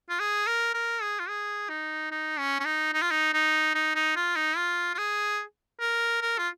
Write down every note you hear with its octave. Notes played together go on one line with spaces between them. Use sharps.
F4
G#4
A#4
A#4
G#4
F4
G#4
D#4
D#4
C#4
C#4
D#4
D#4
F4
D#4
D#4
D#4
D#4
F4
D#4
F4
F4
G#4
A#4
A#4
F4